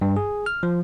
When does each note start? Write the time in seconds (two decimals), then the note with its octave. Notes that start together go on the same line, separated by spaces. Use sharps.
0.01 G2
0.16 G#4
0.46 F6
0.63 F3